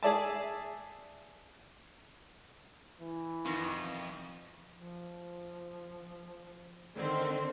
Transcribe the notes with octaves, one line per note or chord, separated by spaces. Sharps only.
G#4 D5 E5 A5
E3
F2 B2 D#3
F3
D3 D#3 C4 A4